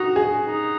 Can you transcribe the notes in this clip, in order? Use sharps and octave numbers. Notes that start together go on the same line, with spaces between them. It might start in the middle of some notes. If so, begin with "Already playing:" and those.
Already playing: D#4 F#4
G#4
D#4